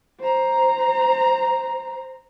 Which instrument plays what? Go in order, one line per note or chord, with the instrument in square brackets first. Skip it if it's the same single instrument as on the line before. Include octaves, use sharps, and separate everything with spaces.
[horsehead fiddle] C5 A#5